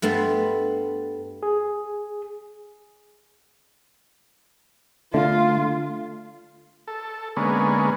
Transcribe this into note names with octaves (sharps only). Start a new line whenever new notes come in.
G2 A3 B3 A5 C6
G#4
D3 A3 F4
A4
D3 G#3 A#3 B3 C#4